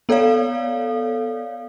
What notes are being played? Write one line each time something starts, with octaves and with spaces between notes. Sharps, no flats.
B3 A4 C#5 D5 F5